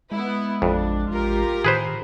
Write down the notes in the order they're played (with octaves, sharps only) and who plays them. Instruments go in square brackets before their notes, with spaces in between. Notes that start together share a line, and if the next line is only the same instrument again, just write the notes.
[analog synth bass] G#3 [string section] B3 E4
[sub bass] A1 [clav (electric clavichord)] F2 [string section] D4
[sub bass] A1 [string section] F4 G4 A#4
[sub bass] A2 [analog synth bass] D#3 [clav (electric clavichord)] G#4 B4 C5